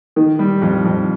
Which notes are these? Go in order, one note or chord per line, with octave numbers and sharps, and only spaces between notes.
D#3
G3
F2
F2